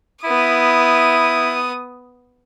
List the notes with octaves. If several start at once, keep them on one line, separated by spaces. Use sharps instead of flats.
B3 E4 D#6